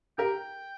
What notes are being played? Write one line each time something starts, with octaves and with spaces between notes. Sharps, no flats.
G4 A#4 G5